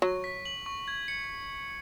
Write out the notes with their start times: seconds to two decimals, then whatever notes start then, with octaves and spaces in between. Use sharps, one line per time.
0.02 F#3 C#6
0.24 B6
0.45 F#7
0.66 C#6
0.88 G#6
1.08 C#7